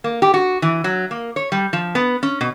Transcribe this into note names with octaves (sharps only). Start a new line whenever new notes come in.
A#3
G4
F#4
E3
F#3
A#3
C#5
G3
F3
B3
C#4
B2